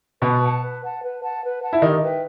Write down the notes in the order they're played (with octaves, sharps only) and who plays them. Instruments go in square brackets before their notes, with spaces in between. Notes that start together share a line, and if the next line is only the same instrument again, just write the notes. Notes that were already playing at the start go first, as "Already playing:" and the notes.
[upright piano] B2 B3 [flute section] B4
[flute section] F#5 A5
B4
F#5 A5
B4
F#5 A5
B4
F#5 A5
[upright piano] E4
[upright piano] D#3 D#4 [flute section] G4
[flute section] B4 E5 G5